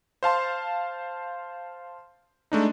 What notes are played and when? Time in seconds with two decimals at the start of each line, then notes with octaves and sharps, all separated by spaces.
0.23 C5 F5 A5 C6
2.52 G#3 A3 D4 D#4